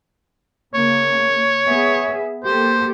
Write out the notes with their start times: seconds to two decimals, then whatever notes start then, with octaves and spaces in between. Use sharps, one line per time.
0.74 C#3 A#3 C#5
1.66 B3 G#4 E5
2.44 A#3 G4 A4 C5